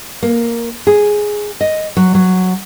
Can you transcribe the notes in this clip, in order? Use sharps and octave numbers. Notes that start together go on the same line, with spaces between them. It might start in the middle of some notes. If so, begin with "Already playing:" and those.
A#3
G#4
D#5
F#3
F#3